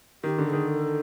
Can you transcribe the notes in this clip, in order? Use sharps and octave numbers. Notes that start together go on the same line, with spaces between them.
D#3 G4
D3
A4
D#3 G#4
A4